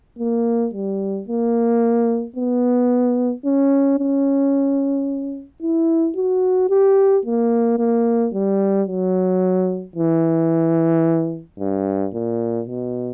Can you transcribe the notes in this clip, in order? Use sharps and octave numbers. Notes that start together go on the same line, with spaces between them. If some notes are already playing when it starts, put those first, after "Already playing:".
A#3
G3
A#3
B3
C#4
C#4
E4
F#4
G4
A#3
A#3
G3
F#3
E3
G2
A#2
B2